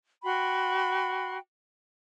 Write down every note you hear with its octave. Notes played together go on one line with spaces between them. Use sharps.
F#4 G5 B5 C6